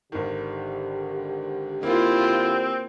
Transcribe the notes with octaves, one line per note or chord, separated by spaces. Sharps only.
G#1 D3 D#3 G4
A#3 C4 E4 F4